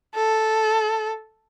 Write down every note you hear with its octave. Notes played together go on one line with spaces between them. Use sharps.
A4